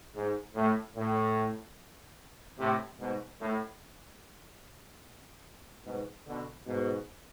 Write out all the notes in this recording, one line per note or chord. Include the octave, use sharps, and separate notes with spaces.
G#2
A2
A2
A2 C3
G#2 B2
A2
G#2 B2
B2 D3
G#2 B2